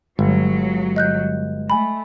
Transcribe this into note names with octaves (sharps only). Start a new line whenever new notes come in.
G1 F#3 G#3
D#5 F#6 G6
A3 G#5 B5